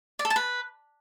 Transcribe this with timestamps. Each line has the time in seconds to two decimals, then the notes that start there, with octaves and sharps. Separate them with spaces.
0.19 D5
0.25 A4
0.30 A5
0.36 B4